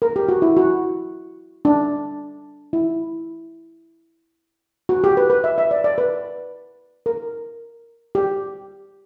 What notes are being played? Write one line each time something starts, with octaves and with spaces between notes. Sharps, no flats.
A#4
G4
F#4
E4
F#4
D4
E4
F#4
G4
B4
B4
E5
E5
D5
D5
B4
A#4
G4